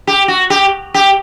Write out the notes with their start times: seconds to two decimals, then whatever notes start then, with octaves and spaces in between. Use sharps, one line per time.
0.07 G4
0.28 F#4
0.50 G4
0.94 G4